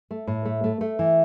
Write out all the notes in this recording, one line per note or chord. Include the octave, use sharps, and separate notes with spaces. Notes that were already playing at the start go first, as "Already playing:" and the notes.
A3
A2
A3
A3
A3
E3